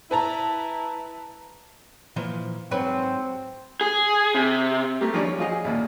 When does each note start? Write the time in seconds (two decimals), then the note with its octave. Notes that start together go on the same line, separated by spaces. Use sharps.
0.11 E4 B4 A5 A#5
2.16 A#2 E3 F3
2.71 G#2 F#3 C4 B4
3.81 G#4
4.34 C3
5.01 A3 A#3 G4
5.13 D#3 F3 G3 A#3 C#4 D4
5.25 C#5
5.38 F3 F4 F#4 G#4 D#5 F5
5.51 G#4
5.64 A1 D#2 A#2